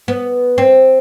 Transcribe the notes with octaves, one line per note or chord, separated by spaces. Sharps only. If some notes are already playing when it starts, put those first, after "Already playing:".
B3
C4